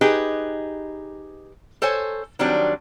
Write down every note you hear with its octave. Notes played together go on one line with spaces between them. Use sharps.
D#4 G4 G#4 B4 D#5
A4 C5 C#5 G#5
D#3 F#3 G3 C4 D4